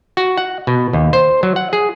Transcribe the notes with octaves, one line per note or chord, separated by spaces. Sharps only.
F#4
F#5
B2
D#2
C5
F#3
F#5
G#4